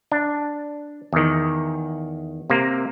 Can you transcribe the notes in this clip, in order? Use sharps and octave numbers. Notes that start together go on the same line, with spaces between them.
D4
E2 D#3
C3 A#3